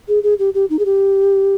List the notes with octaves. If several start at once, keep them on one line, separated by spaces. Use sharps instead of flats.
G#4
G#4
G4
G4
D#4
G#4
G4